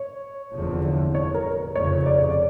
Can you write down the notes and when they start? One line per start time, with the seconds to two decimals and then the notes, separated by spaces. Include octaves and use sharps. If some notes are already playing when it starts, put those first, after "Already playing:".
Already playing: C#5
0.54 F1 E2 D3 F3
1.15 C#5
1.34 A#4
1.75 F1 F2 C#3 C#5
2.06 D5
2.18 C#5
2.30 D5